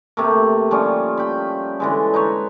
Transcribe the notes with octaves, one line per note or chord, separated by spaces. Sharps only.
C3 A3 A#3
F3 G3 C#4
G5 B5
D3 E3 G#3
D#4 B4 C#5